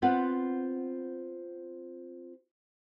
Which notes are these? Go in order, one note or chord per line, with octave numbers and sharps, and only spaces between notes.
B3 C4 F4 B4 F#5